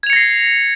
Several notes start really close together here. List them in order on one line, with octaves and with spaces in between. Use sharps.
G#6 F7 C#7 A#6 C7